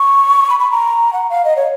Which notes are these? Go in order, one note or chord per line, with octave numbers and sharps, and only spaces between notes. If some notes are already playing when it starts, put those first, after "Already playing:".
Already playing: C#6
B5
B5
A#5
F#5
F5
D#5
C#5